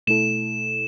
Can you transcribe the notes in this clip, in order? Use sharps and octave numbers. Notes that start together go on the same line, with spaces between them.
B2 A3 E4 A4 E7